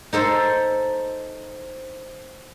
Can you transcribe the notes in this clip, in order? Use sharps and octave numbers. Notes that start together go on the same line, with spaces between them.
D#4 A4 C5